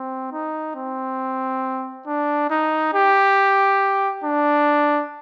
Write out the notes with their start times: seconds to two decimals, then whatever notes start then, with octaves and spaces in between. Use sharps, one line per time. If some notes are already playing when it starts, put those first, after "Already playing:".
Already playing: C4
0.32 D#4
0.76 C4
2.07 D4
2.50 D#4
2.94 G4
4.24 D4